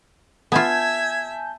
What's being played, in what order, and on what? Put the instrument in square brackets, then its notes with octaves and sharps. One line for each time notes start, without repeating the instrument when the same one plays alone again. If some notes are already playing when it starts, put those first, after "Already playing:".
[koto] B3 F4 [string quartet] E5 [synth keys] G#5 A5 G6 [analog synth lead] G#6